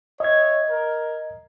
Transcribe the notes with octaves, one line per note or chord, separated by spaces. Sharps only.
C#5 D#5 E5 G#6
A#4